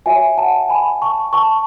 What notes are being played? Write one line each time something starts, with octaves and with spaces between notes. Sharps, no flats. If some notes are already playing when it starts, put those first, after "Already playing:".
F#4 C#5 E5 G#5
F#5 A5
G#5 B5
A5 C#6
A5 C#6